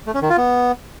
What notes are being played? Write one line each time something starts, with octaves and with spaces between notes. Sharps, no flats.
A3
C#4
D#3
F4
B3